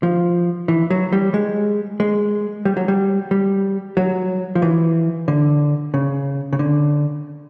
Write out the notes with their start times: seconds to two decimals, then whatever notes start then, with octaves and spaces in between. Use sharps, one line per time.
0.03 F3
0.68 E3
0.90 F#3
1.12 G3
1.34 G#3
2.00 G#3
2.65 G3
2.77 F#3
2.88 G3
3.31 G3
3.97 F#3
4.55 F3
4.62 E3
5.28 D3
5.94 C#3
6.53 C#3
6.59 D3